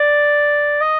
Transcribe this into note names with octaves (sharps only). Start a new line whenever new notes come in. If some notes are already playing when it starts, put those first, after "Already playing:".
Already playing: D5
D#5